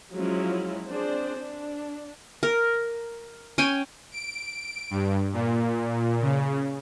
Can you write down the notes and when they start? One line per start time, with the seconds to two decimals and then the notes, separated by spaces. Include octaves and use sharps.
0.14 F3 F#3 G#3 C#4 E4 F4
0.88 C4 D4 G#4 C5 D5
1.37 D4
2.43 A#4
3.58 C#4 G5 G#5
4.12 D7
4.91 G2
5.33 A#2
6.22 C#3